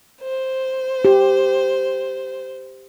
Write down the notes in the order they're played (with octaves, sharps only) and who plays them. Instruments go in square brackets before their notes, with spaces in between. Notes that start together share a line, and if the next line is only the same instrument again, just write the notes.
[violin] C5
[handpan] G4